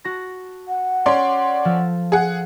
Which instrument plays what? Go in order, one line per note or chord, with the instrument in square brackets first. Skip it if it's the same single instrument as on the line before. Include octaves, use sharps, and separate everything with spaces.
[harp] F#4 A5 A#6
[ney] F#5
[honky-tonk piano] C#4 D5 C6
[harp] F3 A4
[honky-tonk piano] G#4 F#5